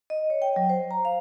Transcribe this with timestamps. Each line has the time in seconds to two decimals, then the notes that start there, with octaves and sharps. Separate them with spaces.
0.10 D#5
0.30 C#5
0.42 G5
0.56 F#3
0.69 C5
0.91 A#5
1.05 F5